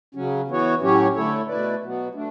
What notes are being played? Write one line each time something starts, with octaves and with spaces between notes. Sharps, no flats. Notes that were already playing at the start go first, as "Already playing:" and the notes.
C#3 F#3 C#4
E3 B3 F#4 C#5
A2 F#3 C#4 G4 C#5
D3 A3 E4 A4 C#5
B2 A3 E4 B4 D5
B2 F#3 B3
A3 D4